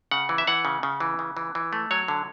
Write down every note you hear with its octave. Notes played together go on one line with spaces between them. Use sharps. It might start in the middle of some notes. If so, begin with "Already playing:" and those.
C#3 F#5
E3
E5
E3 F#5
C#3
C#3
E3
C#3
E3
E3
A3
F#3 C#5
D3